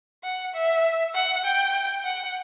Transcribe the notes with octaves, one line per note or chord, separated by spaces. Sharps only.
F#5
E5
F#5
G5
F#5